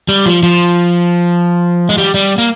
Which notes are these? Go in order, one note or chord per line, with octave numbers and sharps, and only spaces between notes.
G3
F3
F3
G#3
G3
G3
A#3